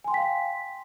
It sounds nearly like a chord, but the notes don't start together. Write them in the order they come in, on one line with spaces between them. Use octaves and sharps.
G#5 C6 G5 B6 F5